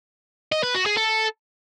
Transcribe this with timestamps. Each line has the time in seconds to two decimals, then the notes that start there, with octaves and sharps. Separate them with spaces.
0.52 D#5
0.63 B4
0.75 F#4
0.86 G#4
0.97 A4